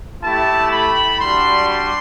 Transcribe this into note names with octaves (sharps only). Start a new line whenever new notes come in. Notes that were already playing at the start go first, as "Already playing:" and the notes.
A3 E4 G4 A5
B5
G3 D4 F#4 C6
C6